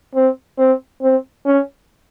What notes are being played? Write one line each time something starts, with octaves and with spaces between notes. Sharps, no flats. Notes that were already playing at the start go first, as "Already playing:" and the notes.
C4
C4
C4
C#4